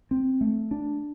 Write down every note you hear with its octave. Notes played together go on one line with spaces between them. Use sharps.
C4
A3
D4